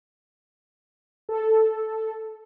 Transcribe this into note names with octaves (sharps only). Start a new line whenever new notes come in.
A4